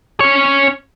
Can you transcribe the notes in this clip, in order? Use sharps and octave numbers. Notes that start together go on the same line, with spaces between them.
C#4 C#5